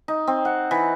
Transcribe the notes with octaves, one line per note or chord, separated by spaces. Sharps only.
D#4
C4
F#5
E3